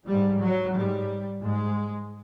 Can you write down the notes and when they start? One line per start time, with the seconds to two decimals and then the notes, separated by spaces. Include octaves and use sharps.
0.09 G#2 G3
0.42 F#3
0.76 G#2 G3
1.43 G#2 G#3